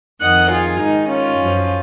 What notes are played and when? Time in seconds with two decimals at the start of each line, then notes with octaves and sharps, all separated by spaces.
0.21 F2 D#3 D#5 F#5
0.50 F4 G#4
0.80 G#2 D#3 D#4
1.09 C#4 F4
1.39 F#2 F3